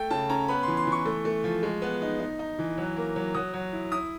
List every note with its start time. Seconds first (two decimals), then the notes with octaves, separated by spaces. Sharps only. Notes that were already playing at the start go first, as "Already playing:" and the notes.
Already playing: A3 G5
0.11 C#3 A5
0.30 C#4 A#5
0.48 B3 B5
0.63 E3 C6
0.77 C6
0.87 E3
0.92 C#6
1.05 A3
1.25 A3
1.44 F3
1.63 G#3
1.82 B3
2.02 D#4
2.20 D#4
2.39 D#4
2.59 E3
2.78 F#3
2.96 A#3
3.16 F#3
3.34 F#3 D#6
3.54 F#3
3.73 E4
3.92 E4 D#6